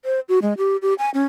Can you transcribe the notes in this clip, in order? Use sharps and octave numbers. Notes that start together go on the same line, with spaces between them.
C5
F#4
G#3
G4
G4
G#5
C#4